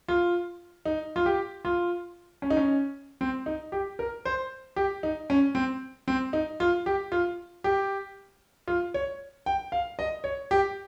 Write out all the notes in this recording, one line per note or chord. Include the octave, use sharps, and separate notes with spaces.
F4
D#4
F4
G4
F4
C#4
D#4
C#4
C4
D#4
G4
A#4
C5
G4
D#4
C#4
C4
C4
D#4
F4
G4
F4
G4
F4
C#5
G5
F5
D#5
C#5
G4